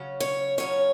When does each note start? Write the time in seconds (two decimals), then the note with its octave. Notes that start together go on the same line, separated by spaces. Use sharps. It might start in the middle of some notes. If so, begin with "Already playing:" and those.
Already playing: C#3 F#3 C#4
0.20 C#5
0.58 C#3 F#3 C#4 C#5